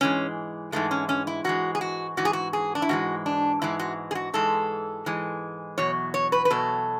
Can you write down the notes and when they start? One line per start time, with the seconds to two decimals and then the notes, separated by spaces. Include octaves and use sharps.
0.01 G#2 E3 G#3 C#4
0.72 G#2 E3 G#3 A3
0.91 C#4
1.09 C#4
1.27 E4
1.44 G#2 E3 G#3 F#4
1.75 G#4
1.81 F#4
2.17 G#2 E3 F#4
2.25 G#4
2.33 F#4
2.53 G#4
2.75 D4
2.82 E4
2.89 G#2 E3 G#3 F#4
3.26 D4
3.62 G#2 E3 G#3 E4
3.79 F#4
4.11 G#4
4.15 F#4
4.34 G#2 E3 G#3 A4
5.06 G#2 E3 G#3
5.78 E2 B2 F#3 C#5
6.14 C#5
6.32 B4
6.45 B4
6.50 E2 B2 F#3 A4